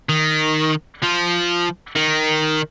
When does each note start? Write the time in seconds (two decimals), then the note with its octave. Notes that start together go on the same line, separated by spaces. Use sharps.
0.09 D#3
1.02 F3
1.96 D#3